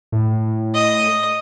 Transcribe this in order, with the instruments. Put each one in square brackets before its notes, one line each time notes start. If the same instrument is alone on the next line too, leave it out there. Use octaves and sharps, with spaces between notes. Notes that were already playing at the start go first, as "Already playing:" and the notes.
[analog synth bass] A2
[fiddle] D#5